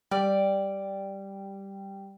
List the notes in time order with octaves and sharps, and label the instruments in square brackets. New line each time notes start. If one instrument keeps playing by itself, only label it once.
[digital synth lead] G3 [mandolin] D5